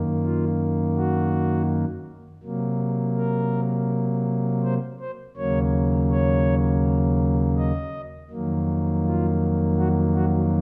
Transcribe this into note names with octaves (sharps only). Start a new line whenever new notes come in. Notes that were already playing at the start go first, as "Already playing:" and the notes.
Already playing: F#2 D#3 A#3
F4
F#4
C3 F#3 A#3
A#4
C5
C5
D#2 C#3 F#3 A#3 C#5
C#5
D#5
F2 D#3 F#3 A#3
F4
F#4
F#4